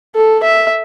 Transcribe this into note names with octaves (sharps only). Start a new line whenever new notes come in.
A4
E5